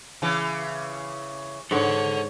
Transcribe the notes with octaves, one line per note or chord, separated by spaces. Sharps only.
C#3 E3
G#2 D3 A4 C#5 F#5